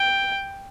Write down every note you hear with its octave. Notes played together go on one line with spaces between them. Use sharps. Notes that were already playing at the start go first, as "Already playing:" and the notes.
Already playing: G5